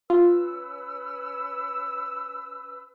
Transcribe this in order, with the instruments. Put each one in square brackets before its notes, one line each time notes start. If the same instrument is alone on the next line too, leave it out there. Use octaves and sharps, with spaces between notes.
[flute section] C#4 B4 E6 [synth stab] F4